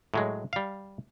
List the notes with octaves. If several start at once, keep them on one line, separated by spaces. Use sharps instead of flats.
A2 F#3 G#3
G3 F5